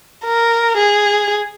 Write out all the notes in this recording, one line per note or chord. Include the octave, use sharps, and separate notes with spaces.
A#4
G#4